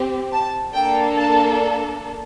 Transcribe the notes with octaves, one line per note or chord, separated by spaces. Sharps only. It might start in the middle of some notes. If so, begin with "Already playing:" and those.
Already playing: C4 G4
A5
A#3 D4 A4 G5
A5